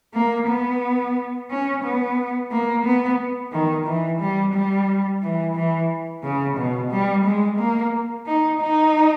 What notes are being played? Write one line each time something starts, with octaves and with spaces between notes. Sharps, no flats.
A#3
B3
C#4
B3
A#3
B3
D#3
E3
G3
G3
E3
E3
C#3
B2
G3
G#3
A#3
D#4
D#4